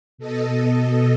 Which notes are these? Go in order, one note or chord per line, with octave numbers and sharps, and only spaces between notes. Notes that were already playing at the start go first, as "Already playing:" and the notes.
B2 A4 D#5